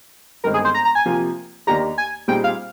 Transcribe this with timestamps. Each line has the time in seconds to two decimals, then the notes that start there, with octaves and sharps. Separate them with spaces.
0.44 G1 G2 D#3 G#3 C4 A#4
0.54 G#4
0.65 C5
0.75 A#5
0.85 A#5
0.95 G#5
1.06 C3 F3 A#3
1.67 D#2 D#3 A#3 D4 G4 A#5
1.98 G#5
2.28 A#2 G3 C4 D#4 G#4 G5
2.44 F5